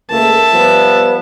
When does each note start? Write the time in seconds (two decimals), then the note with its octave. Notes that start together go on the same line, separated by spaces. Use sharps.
0.10 C#2 A3 A#3 E5 A5
0.53 F3 G3 B3